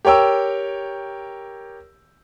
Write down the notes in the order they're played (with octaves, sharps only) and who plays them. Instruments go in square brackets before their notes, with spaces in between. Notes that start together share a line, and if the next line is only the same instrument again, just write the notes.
[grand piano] G4 A#4 C#5 G5 E6